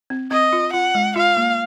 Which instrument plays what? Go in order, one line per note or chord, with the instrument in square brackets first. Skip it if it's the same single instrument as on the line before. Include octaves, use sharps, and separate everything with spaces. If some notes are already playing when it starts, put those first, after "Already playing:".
[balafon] C4
[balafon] C4 [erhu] D#5
[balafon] F4
[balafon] F4 [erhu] F#5
[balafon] G#3
[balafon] F4 [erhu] F5
[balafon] A#3